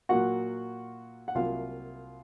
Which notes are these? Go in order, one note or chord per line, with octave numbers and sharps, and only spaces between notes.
A#2 F#3 A#3 F4 F#4 F#5
F#5
C2 C3 F#3 A#3 F4 F5